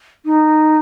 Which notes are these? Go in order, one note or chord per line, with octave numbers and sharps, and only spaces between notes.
D#4